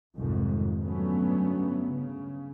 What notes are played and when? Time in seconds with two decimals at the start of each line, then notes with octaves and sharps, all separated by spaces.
0.15 F1 C2 F2 G#2 D#3
0.82 D2 G2 F#3 A3 B3 C#4
1.87 C#3